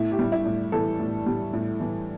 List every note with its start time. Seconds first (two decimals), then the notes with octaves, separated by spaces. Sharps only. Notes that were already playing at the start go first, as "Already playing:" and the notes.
Already playing: A2 E4
0.12 G4
0.19 G3
0.32 E4
0.45 A2
0.72 E3 A4
0.99 A2
1.26 G3
1.53 A2
1.80 E3